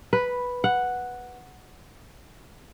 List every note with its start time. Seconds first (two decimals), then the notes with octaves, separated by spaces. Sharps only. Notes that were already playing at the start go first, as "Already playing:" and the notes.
0.13 B4
0.64 F#5